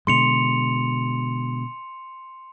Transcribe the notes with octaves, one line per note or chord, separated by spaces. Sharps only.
B2 D3 G#3 C6 C#7 F7